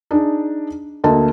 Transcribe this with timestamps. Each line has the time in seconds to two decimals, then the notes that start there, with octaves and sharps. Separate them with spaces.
0.11 D4 D#4 G#4
1.04 D2 A#3 A4 D#5 A5